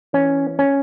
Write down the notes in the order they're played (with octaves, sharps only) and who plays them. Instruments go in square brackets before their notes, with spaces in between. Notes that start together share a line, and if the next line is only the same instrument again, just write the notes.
[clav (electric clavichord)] E3 C#4
C#4